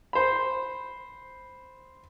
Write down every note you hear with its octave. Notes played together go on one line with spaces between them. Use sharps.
C5 B5